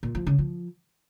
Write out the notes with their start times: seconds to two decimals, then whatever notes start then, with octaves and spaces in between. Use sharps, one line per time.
0.03 A#2
0.15 F3
0.27 C#3
0.38 F3